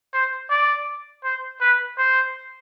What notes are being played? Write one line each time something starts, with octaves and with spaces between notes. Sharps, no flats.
C5
D5
C5
B4
C5